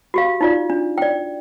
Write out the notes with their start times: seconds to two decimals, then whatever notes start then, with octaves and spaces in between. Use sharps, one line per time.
0.14 F#4 G4 F5
0.41 D#4 F4 D5
0.70 D4
0.98 D5 G5